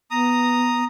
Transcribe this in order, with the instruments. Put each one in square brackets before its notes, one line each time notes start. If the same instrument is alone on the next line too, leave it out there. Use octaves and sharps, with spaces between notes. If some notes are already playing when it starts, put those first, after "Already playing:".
[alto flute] B3 [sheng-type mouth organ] A#5 D#6